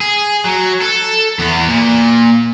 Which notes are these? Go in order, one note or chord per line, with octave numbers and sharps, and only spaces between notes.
G#4
F#3
A4
E2 B3
A#2